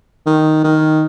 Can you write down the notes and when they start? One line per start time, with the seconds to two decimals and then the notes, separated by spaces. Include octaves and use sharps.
0.26 D#3
0.64 D#3